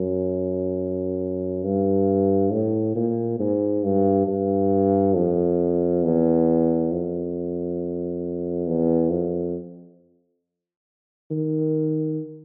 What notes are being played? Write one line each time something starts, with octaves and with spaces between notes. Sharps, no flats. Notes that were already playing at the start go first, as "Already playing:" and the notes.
Already playing: F#2
G2
A2
A#2
G#2
G2
G2
F2
E2
F2
E2
F2
D#3